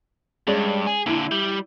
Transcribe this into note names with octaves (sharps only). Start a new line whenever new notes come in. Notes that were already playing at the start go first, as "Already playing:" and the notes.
G2 G#3 C#4 D5
G#4
A#2 D3 E4
G3